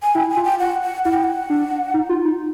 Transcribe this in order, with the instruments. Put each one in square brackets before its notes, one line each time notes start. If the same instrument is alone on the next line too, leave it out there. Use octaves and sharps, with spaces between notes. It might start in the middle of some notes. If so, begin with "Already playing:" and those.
[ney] G#5
[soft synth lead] E4 [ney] G5
[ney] G#5
[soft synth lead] F4
[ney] G5
F#5
F#5
[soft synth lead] E4 [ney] F#5
[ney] G5
F#5
[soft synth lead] D4
D#4
F4
D#4